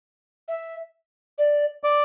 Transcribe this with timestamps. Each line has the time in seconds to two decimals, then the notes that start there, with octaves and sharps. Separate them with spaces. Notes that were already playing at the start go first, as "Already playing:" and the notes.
0.48 E5
1.38 D5
1.83 D5